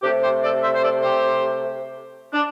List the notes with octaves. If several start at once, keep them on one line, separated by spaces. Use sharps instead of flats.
C3 A3 D4 G4
G4 C5
A4 D5
C5 E5
C5
A4 D5
G4 C5
D4